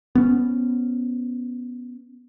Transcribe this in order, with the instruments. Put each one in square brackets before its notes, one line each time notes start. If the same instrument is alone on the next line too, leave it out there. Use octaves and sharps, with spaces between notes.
[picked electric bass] B3 C#4